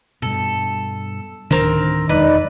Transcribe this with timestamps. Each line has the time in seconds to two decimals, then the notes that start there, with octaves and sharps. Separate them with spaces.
0.22 G2 B2 A4
1.51 D1 D3 D#3 C4 D4 A#4
2.09 E1 F#2 G#3 D#4 B4 D5